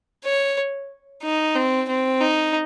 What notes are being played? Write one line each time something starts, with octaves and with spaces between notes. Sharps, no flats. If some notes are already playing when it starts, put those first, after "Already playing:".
C#5
D#4
C4
C4
D#4